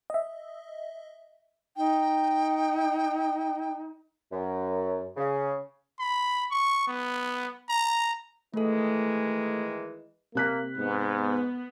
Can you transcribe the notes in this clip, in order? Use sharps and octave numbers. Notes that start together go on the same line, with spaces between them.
D#5 E5
D#4 G5
F#2
C#3
B5
C#6
B3
A#5
D#3 E3 G#3 A3 A4
C3 A#3 F#6 B6
G#2 B3